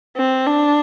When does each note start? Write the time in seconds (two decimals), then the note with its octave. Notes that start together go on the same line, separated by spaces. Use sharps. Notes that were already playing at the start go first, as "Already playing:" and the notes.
0.17 C4
0.47 D4